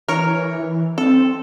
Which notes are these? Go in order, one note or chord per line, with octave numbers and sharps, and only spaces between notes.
E3 A#4 C#5
E3
C4 A4